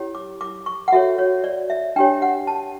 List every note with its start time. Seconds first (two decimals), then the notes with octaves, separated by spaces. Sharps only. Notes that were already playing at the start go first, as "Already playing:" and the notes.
Already playing: C#4 E4 G4 C#5
0.15 D6
0.41 D6
0.66 C#6
0.88 F#5
0.92 F#4 A4 C#5 E5
1.18 C#5
1.44 D5
1.70 E5
1.96 D4 G4 C#5 G5
2.22 F#5
2.47 A5